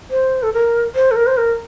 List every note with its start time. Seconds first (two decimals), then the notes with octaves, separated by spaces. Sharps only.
0.11 C5
0.43 A4
0.53 A#4
0.95 C5
1.11 A4
1.16 A#4
1.27 C5
1.37 A#4